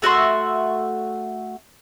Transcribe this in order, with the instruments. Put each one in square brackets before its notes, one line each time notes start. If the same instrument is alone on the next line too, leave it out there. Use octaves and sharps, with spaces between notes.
[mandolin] A3 F#4 E5 C6